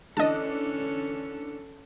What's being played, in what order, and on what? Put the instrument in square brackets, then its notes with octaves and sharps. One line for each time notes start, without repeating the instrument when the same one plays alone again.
[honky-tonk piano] D3 E3 D4 [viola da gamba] C#4 A4 [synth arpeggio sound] D#5 A5